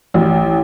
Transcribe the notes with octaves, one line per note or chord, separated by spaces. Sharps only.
A1